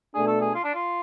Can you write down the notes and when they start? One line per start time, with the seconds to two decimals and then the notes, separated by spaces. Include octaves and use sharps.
0.14 B2 A3 D4 G#4
0.27 A4
0.41 G#4
0.55 F4
0.64 D4
0.75 F4